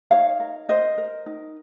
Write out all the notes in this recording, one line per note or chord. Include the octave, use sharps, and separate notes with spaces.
D#4 C#5 F5
A#4
A#4 C5 D#5
A#4
D#4